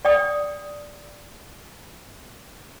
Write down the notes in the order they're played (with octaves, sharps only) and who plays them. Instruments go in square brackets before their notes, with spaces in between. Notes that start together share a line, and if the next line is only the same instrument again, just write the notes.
[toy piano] D5 G5 D#6